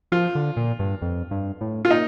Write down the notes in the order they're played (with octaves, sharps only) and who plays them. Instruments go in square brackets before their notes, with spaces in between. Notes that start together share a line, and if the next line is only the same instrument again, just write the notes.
[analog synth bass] F3 [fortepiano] F4
[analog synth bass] D3
A#2
G2
F2
G2
A2
[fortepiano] F4
[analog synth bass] A#2 [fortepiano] D#4